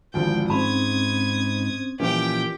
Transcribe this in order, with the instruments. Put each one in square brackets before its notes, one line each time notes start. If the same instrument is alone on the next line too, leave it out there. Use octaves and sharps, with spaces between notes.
[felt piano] G#1 D2 F3 [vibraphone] G#3 E4 [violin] G5
[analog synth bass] G#2 [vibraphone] C4 C#4 C5 [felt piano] B5 [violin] D#6 G#6
[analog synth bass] A#2 [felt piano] E3 F3 C#4 [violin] G4 G5